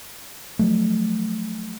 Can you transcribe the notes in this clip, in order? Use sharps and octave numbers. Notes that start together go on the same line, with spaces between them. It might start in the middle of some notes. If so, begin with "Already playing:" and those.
F3 F#3 A3